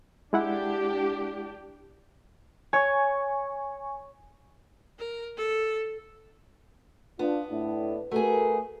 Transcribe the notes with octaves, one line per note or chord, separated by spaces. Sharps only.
G#3 D4 E4 G4 F#5
C#5 G#5 C#6
A#4
A4
B3 D4 F4
A2 D4 E4
A3 F#4 G#4 A#4 B4